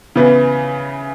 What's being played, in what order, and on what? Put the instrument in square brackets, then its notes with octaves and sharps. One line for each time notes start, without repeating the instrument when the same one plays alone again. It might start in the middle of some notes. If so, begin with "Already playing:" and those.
[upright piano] C#3 E3 B3